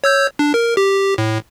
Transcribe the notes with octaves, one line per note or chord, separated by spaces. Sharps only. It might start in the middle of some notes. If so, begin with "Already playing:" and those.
C#5 E6 G6
D4
A#4
G4
A2